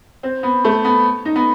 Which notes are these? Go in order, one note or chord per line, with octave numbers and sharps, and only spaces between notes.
C4
B3
A3
B3
D#4
B3